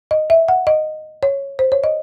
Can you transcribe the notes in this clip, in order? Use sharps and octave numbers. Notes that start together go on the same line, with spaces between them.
D#5
E5
F#5
D#5
C#5
C5
C#5
D#5